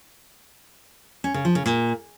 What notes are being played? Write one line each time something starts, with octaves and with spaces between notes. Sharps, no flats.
C#4
C#3
F3
C#3
A#2